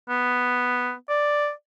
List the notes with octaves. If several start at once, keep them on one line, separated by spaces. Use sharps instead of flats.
B3
D5